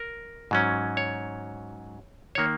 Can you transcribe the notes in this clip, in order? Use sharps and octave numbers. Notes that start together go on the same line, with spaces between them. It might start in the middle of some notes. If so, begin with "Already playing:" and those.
Already playing: A#4
G#2 F#3 C#4
C#5
D#3 A#3 C#5